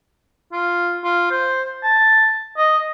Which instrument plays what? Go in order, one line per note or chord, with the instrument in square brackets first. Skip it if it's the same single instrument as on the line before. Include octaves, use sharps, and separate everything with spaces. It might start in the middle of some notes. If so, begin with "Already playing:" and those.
[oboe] F4
F4
C5
A5
D#5